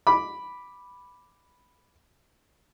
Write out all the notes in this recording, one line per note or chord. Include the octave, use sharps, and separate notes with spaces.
B5 D6